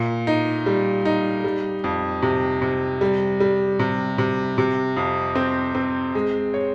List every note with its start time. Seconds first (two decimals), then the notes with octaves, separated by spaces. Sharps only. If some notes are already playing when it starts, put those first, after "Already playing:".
Already playing: A#2
0.27 D#4
0.66 G3
1.05 D#4
1.44 G3
1.84 F2
2.22 C3
2.62 C3
3.01 G3
3.40 G3
3.79 C3
4.18 C3
4.58 C3
4.97 F2
5.35 C4
5.75 C4
6.15 G#3
6.54 C#5